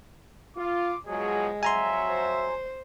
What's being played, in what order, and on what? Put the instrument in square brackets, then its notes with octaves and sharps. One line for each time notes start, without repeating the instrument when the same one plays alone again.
[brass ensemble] F4 [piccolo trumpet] D6
[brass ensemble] B2 F3 F#3 [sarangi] G#3 [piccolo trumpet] G#4
[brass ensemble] F2 F#3 [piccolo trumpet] E5 [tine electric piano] G#5 A#5 C6
[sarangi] C5